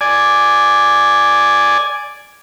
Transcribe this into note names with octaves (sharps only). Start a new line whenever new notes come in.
D5 G#5